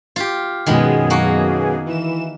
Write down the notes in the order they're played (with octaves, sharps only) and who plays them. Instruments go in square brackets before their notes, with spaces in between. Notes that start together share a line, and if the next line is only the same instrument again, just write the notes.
[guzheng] F4 G4
[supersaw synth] F#2 B2 G#4 [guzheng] D#3 G#3 B3
[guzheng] A#3 F#4
[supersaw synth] E3 E7